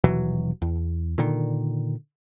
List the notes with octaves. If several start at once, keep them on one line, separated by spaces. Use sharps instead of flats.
D#1 B2 E3 F#3
E2
A#2 D3 D#3